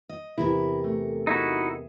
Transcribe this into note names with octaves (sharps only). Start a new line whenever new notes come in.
D#5
E2 C3 E4 A#4
A3
D#4 E4 F#4 G#4 E5